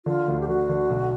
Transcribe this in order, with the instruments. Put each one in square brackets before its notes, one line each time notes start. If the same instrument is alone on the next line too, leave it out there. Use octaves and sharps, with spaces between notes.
[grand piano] D3 [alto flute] F4
[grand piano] D2
[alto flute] G4
[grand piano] D3 [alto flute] F#4
[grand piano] D3
B1